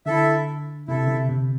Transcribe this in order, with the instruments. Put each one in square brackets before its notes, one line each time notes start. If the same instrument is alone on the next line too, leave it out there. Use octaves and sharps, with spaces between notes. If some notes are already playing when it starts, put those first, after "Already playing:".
[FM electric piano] D3 [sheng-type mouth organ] E4 A4 E5
[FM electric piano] C3 [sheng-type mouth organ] E4 A4 E5
[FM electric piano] C3
C3